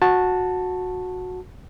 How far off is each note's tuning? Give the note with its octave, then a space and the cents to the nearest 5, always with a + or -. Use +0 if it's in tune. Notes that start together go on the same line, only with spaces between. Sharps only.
F#4 -15 A5 +0